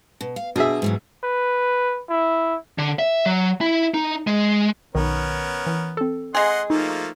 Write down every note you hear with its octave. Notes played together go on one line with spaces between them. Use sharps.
B2
F5
B2 D4 G#4 D#5 E5
G#2 E3 F#3
B4
E4
D3
E5
F#3
E4
D#4
G#3
B1 D#3 B3 C#4 A#4
E3
C4 A4
G#3 G#4 D#5 F#5 C6
F3 A3 A#3 D#4